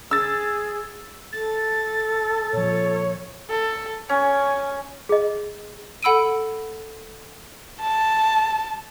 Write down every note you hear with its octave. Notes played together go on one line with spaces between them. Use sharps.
G#4 E6 A6
A4 A6
A#2 F3 C#5
A4
C#4 G#5
G#4 D#5
A4 F#5 B5 E6 D7 D#7
A5